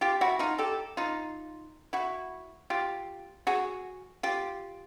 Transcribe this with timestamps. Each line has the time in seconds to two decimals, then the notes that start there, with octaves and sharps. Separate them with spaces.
0.01 F4 G4
0.21 E4 F#4
0.39 D#4 F4
0.58 G4 A4
0.97 D#4 F4
1.93 E4 F#4
2.70 F4 G4
3.47 F#4 G#4
4.23 F4 G4